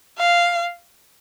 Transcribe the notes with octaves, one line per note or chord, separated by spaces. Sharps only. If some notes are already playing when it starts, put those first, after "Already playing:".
F5